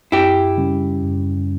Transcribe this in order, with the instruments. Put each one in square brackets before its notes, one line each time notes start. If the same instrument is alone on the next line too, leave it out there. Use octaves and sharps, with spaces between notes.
[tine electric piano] F#2 [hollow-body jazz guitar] E4 G4
[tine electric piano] C#3 G3 C#4
F#2